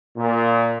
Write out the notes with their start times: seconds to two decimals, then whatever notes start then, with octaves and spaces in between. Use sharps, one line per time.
0.17 A#2